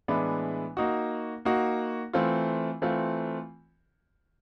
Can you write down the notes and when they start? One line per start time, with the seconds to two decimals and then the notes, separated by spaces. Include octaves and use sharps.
0.08 A2 E3 G#3 B3 D4
0.77 A#3 D#4 F#4
1.45 A#3 D#4 F#4
2.13 E3 A3 C4 F4
2.82 E3 A3 C4 F4